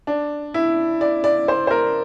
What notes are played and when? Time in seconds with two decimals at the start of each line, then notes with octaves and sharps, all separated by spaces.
0.07 D4
0.54 E4
1.01 D5
1.24 D5
1.48 C5
1.67 C5
1.71 A#4